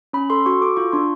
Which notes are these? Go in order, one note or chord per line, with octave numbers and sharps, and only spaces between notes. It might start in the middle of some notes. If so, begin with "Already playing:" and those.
C#4 B5
A4 C6
F#4 C#6
A4 D6
F4 C#6
D4 C6